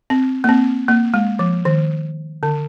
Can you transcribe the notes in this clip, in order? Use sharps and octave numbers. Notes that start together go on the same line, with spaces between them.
C4
A#3
C4
A#3
G#3
F3
D#3
D3